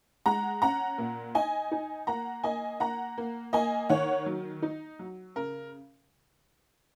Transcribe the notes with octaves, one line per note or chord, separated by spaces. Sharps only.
G#3 F#5 A#5
C#4 F#5 A#5
A#2
D#4 D#5 G#5
D#4
A#3 F#5 A#5
A#3 D#5 G#5
A#3 F#5 A#5
A#3
A#3 D#5 G#5
D#3 C#5 F#5
F#3
D#4
F#3
C#3 A#4